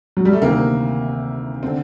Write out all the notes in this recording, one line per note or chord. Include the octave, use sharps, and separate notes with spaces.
F#3
G3
A3
D2 C3 D#3 A#3
D3 C4